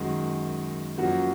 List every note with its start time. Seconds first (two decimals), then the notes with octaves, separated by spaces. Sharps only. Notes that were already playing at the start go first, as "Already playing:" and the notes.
Already playing: F#2 D#3 G#3 F#4
0.98 F#2 F3 A#3 F#4